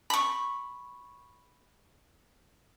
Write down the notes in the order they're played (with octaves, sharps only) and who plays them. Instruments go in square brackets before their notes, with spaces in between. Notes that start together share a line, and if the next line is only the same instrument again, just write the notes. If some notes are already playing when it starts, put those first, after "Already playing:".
[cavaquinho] B5 C#6